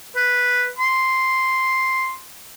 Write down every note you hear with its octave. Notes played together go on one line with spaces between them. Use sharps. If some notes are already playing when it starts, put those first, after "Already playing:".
B4
C6